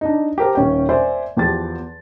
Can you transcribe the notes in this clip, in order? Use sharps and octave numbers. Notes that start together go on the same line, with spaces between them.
D4 D#4
G4 A4 A#4 C5
D#1 C#4 G5
C5 D5 E5 G#5
E2 F3 G4 A4 A6